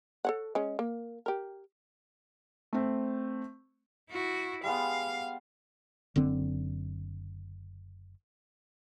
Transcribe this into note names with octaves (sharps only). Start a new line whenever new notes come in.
A4 C#5 F#5
G#3 C#4
A#3
G4 A#4
A3 C4
E4 F#4
G3 G#3 B3 F5
F#1 D3 C4